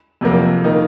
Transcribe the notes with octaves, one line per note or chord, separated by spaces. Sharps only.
F2 C3 F#3 A#3
D#3 A#3 D#4